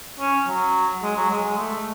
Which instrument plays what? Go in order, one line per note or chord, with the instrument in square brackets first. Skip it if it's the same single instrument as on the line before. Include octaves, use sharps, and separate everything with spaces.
[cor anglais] C#4
F#3
G#3
F#3
G#3
G#3
A3